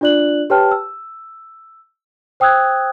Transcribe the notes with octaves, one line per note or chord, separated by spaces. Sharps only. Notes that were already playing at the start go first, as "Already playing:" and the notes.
D4 F4 D5 F#6 F#7
G4 B4 C#5 G5 A5 F6
E6
C5 G5 D#6 E6 F#6 G#6